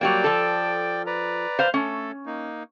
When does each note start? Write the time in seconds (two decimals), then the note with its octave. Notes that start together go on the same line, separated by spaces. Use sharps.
0.01 F#3 G3 A#3 D5 G5
0.24 F3 A4
1.07 B4 D5 A#5
1.59 C5 F5
1.74 A3 C#4 A4
2.26 A#3 D#4